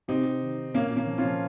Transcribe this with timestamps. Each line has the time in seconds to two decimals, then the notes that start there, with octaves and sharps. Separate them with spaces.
0.08 C3 C4 D#4
0.24 C3
0.41 D#3
0.57 D#3
0.74 A#2 A#3 C#4
0.90 A#2
0.96 A#3 C#4
1.07 F3
1.18 C#4 F4
1.24 F3